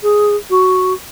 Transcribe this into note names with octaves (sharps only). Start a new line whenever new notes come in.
G#4
F#4